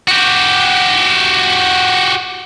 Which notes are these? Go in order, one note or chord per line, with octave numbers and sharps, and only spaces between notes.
F#4 G4